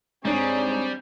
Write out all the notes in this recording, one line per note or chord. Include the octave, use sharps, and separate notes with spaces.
G#2 G3 C4 D4 G#4 C#5 C7